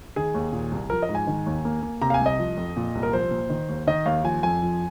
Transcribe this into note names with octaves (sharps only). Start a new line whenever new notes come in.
D#3 G#4
D#2
A#2
C2
F3 A#4
D#5
G#2
G#5
D#3
D#2
A#3
A#3
C3 A#5
F5
G#5
C2
D#5
F3
F2
A#2
C2
A#4
F3 C5
A#2
D#3
D#2
D#3 D#5
D#2 F5
F3 G#5
F2 G#5
F3